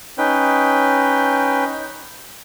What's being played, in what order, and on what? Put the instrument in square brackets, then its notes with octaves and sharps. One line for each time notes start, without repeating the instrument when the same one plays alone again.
[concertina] C#4 D#4 B4 G5